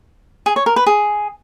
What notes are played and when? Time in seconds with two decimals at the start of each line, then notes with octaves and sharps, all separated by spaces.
0.46 G#4
0.56 C#5
0.66 A#4
0.76 B4
0.86 G#4